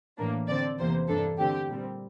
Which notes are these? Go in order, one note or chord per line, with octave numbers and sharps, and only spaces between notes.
A2 E3 A#3 D4
D3 F3 C4 D5
E2 C3 E3 A#3 C5
G2 E3 A#3 D4 A4
D3 A3 C4 G4
A#2 G3 C4